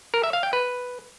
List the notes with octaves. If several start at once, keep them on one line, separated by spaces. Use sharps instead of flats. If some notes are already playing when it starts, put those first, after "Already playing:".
A#4
E5
F5
G5
B4